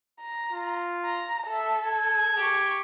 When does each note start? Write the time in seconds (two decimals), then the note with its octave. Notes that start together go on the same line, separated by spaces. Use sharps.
0.21 A#5
0.52 F4
1.05 A#5
1.47 A4 E5
1.85 G#6
2.37 G4 C#6